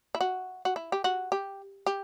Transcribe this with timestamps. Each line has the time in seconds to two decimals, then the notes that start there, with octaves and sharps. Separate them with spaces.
0.15 E4
0.21 F#4
0.65 F#4
0.76 E4
0.92 G4
1.04 F#4
1.32 G4
1.86 G4